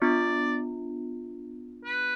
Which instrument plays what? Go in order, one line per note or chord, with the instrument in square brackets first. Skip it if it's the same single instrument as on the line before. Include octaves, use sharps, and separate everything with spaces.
[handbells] B3 D4 F4 [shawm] D5
[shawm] B4